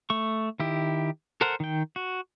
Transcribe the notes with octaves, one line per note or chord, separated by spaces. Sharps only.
A3 C#6
D#3 E4 G4
A4 A#4 C5 F#5
D#3 G5
F#4